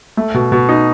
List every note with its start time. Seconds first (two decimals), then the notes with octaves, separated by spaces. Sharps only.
0.17 A3
0.34 B2
0.52 B2
0.69 D#4